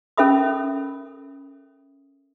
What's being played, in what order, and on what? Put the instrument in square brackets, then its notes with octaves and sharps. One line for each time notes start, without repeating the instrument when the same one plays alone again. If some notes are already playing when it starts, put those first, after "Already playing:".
[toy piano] C#4 A4 A#4 E5 B5 D#6